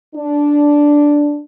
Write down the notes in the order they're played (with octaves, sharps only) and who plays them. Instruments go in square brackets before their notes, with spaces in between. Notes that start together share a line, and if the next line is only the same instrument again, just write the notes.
[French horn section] D4